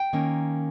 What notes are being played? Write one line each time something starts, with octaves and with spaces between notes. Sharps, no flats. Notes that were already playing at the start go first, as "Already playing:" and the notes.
Already playing: G5
D#3 A#3 C#4